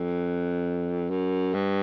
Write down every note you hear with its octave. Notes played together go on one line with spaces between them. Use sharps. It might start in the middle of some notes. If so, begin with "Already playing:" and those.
Already playing: F2
F#2
G2